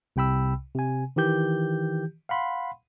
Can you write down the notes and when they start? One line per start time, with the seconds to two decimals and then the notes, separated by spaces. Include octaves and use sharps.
0.16 C2 C3 G5 B5 E6
0.75 C3 G#5
1.16 D#3 E3 G4 G6
2.29 F5 F#5 B5 C6